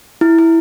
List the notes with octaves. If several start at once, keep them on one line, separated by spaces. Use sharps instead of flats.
E4
E4